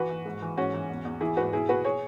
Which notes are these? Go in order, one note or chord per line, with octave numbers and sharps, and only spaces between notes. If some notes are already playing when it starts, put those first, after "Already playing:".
Already playing: E3 F#4 B4
E3
G#2
E3
G#2 C#4 F#4
E3
E2
E2
E3 E4 G#4
G#2 F#4 B4
B2 E4 G#4
B2 F#4 B4
G#4 C#5